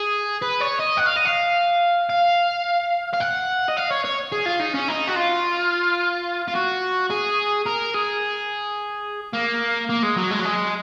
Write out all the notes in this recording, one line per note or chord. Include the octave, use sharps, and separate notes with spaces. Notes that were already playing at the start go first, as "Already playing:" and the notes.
Already playing: G#4
B4
C#5
D#5
F#5
F5
D#5
F5
F5
F5
F#5
D#5
F5
C#5
C#5
G#4
F4
D#4
C#4
D#4
F#4
F4
F4
F#4
G#4
A#4
G#4
A#3
A#3
G#3
F#3
G#3
F#3
G#3